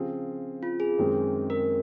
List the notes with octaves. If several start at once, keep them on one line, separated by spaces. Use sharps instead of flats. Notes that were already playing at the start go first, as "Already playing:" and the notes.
Already playing: C#3 F3 C4 F4 G#4
F4
G#4
F#2 D#3 G#3 C4 D#4
A#4